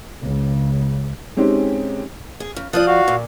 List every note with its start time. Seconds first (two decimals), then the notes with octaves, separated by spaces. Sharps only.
0.21 C#2 C#3
1.37 G#3 C4 C#4 D#4 G4
2.40 G#4
2.56 C#3
2.73 F3 F4 D5 D#6 F#6
2.87 F#4 F5
3.08 A#2